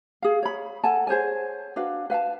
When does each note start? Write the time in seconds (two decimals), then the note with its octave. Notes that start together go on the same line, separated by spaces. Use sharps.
0.22 G#4 F5
0.43 C#5 B5
0.84 A4 F#5 G#5 A5
1.07 G#4 C5 C#5 G#5
1.76 D4 F#4 B4 F5
2.10 B4 F5 F#5 A5